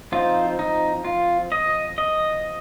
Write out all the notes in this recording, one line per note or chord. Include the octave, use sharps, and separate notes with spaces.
F3 C4 D#4 F4
D#4
F4
D#5
D#5